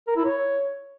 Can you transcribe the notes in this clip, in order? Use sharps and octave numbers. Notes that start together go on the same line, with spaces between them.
A#4
E4
C#5